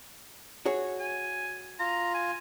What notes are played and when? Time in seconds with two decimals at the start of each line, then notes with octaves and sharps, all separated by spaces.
0.65 F#4 G#4 C#5
0.99 G#5
1.79 F4 A#5
2.14 G#5